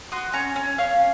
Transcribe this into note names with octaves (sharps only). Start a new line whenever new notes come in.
F#4 C6 D#6
C#4 A#5 C#6
C#4
C#4 C#5 F5